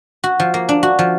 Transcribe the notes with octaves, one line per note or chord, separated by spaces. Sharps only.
F#4
F3
A#3
D4
F#4
F3